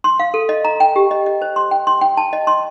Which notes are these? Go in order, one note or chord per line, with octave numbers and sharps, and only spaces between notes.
C6
F5
A4
D#5
A#5
G5
G4
D#5
D#5
C5
C6
G5
C6
G5
A5
D#5
C6